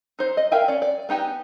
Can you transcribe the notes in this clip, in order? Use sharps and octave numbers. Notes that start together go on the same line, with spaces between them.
D#4 C5
D#5
A#4 E5 F5 G5 G#5
C#4 D5
D5
B3 D#4 G4 G#5